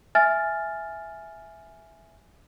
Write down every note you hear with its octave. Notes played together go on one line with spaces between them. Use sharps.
E5 G#5 F6 A6